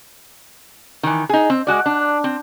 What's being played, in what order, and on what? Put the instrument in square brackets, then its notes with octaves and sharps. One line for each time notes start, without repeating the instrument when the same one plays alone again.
[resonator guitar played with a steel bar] D#3 E3
D#4 G#4
C4
G#3 F#4 D5
D4
C4